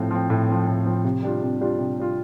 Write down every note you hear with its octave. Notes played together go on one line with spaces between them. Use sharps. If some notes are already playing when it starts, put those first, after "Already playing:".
Already playing: A2 F3 C4
F3 C4
A2
F3 C4
A2
F3 C4
C3
G3 D4 F4
C3
G3 D4 F4
C3
G3 D4 F4